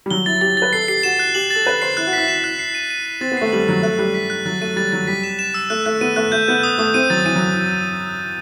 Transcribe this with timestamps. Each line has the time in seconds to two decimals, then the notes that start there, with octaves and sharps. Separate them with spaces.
0.06 G3
0.11 F#3 G7
0.26 E4 A6
0.41 G4 A6
0.57 B4 A6
0.73 A4 C7
0.88 G4 C7
1.03 F#4 E7
1.19 F#6
1.34 G4 F#7
1.51 A4 A6
1.66 B4 A6
1.82 C5 C7
1.97 E4 F#6
2.07 F#4
2.13 E4 B6
2.28 E7
2.44 F#6
2.59 C7
2.75 D#7
2.90 D#7
3.06 D#7
3.21 C4 A6
3.32 B3
3.37 A3 C7
3.52 G3 F#7
3.68 F#3 C7
3.83 A3 F#6
3.99 G3 F#6
4.14 B6
4.30 F#6
4.45 F#3 A6
4.61 A3 D#7
4.76 G3 A6
4.92 F#3 A6
5.07 G3 B6
5.24 E7
5.39 E7
5.54 E6
5.70 A3 F#6
5.86 A3 F#6
6.01 B3 D#7
6.16 A3 F#6
6.32 A3 G6
6.48 B3 G6
6.63 D#6
6.78 A3 D#6
6.94 C4 D#7
7.10 F#3 A6
7.25 E3 D#7
7.36 F#3